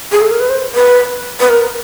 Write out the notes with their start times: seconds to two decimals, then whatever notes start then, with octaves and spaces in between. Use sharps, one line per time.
0.12 G#4
0.21 A4
0.31 A#4
0.40 B4
0.49 C5
0.75 B4
1.40 B4
1.49 A#4